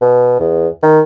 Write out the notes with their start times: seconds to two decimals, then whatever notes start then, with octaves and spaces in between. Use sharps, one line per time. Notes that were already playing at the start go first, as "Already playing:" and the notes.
0.01 B2
0.40 E2
0.83 D#3